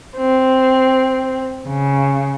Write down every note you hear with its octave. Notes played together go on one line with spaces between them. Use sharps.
C4
C#3